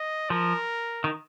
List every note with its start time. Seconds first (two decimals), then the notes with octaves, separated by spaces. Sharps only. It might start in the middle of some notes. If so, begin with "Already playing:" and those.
Already playing: D#5
0.30 F3 A#4
1.04 D#3